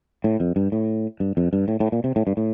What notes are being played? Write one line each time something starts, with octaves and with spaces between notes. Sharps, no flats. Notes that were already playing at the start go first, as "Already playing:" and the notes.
A2
F2
G2
A2
G2
F2
G2
A2
A2
A#2
C3
A2
G2
A2